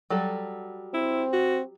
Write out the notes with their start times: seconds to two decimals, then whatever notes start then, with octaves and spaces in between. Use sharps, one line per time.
0.10 F#3 G3 A4
0.94 C4 E4
1.33 F#4